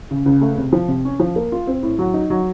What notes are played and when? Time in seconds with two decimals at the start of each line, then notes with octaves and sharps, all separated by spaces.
0.11 C#3
0.26 C#2
0.41 A3
0.58 C3
0.73 F3
0.88 C3
1.05 C#4
1.20 F3
1.36 A#3
1.52 F4
1.67 C4
1.83 A2
1.99 F#3
2.14 D#4
2.30 F#3